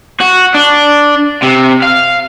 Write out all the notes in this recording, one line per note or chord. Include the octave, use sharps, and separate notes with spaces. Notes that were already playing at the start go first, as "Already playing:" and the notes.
F#4
D4
C3
F5